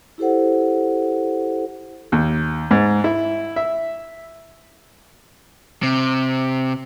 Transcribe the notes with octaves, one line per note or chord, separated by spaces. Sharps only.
E4 G4 A4 C5 F#5
D#2
G#2
E4
E5
C3